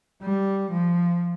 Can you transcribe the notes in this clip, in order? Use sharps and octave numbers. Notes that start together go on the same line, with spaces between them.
G3
F3